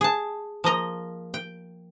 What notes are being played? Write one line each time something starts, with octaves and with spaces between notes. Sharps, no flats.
G#4 A5
F3 A#3 D#5 A#5
G5